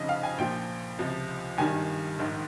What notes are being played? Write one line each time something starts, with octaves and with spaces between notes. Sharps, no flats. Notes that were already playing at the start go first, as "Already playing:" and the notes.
Already playing: F1 F2 C#3 F3 D#5
F5
G#5
A#1 A#2 F3 G5
C#2 C3 F3
G#1 G2 D#3 G3 G#5
A#1 G#2 D#3